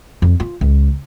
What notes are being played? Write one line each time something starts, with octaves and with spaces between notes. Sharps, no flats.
F2
F4
C#2